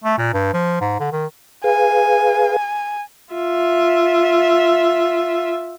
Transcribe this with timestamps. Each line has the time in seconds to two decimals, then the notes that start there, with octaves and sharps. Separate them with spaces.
0.04 A3
0.18 A#2
0.33 G2
0.53 F3
0.81 G#2
1.00 D3
1.12 D#3
1.64 G#4 B4 F5 G#5
3.34 F4 E5